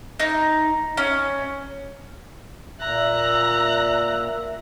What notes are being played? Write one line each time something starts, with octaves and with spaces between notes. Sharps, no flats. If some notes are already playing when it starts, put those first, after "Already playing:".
D#4
C#4
A#2 E5 A#5 F#6